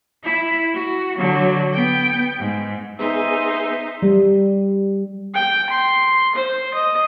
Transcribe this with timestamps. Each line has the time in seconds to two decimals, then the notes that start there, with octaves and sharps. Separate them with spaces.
0.24 E4
0.74 F#4
1.18 D3 F#3
1.73 B3 G5
2.39 G#2
2.99 B3 D#4 G#4 C5 D#5 E5
4.02 G3
5.34 G5
5.70 C6
6.35 C5
6.74 D#5